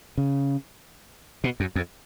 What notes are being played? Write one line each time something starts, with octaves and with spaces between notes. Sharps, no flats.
C#3
B2
F#2
F2